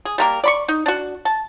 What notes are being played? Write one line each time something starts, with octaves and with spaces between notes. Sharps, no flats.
G#4
G3 A#3 A#4
D5 B5 C#6
D#4
D4 F#4
A5